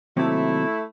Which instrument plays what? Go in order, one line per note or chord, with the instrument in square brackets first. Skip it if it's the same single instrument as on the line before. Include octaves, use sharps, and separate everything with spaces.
[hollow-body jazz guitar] D#2 C3 F#3 [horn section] A3 E4